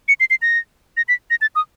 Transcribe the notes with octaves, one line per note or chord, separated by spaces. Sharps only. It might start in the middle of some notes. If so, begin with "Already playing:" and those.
C#7
C7
C7
A#6
A#6
B6
A#6
A6
D#6